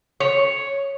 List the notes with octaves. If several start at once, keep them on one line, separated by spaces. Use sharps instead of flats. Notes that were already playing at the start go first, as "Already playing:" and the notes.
C#5